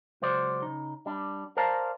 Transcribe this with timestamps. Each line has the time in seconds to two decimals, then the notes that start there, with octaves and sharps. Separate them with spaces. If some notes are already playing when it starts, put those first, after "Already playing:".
0.22 C#2 F#3 C5 D5
0.62 C#3 D#4
1.06 G3 D4
1.57 A#4 C5 D5 F5 A5 A#5